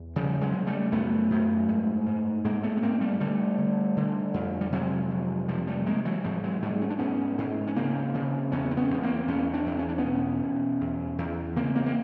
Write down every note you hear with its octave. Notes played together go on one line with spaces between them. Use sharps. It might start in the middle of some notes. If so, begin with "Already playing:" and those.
Already playing: E2
C#3 F3 G3
F#3 G#3
C#3
G3 A3
F#2 A3 B3
F#2
G#2
G#2
G#2 G#3 A#3
A3 B3
B3
G#2 A#3 C4
G3 A3
D3 G3 A3
D3
D3
F2
G3
C3 F#3 G#3
F2
C3 F3 G3
G3 A3
C3 G#3 A#3
E3 F#3
G#2 F3 G3
F#3 G#3
G#2 G3 A3
C#4
D4
G#2 B3 C#4
G#2
C#4
C#3 A#3 C4
C#3
E2 B3 C#4
C4
B3 C#4
E2 B3
A#3 C4
E2 B3 C#4
C4 D4
E2
C#4
D4
B3 C#4
B2
B2
E2
E2
C#3 A#3 C4
A#3 C4
A#3